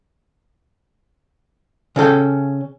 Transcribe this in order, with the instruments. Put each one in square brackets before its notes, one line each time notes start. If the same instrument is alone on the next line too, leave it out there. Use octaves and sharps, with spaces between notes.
[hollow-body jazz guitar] C#3 C#4 A4 G5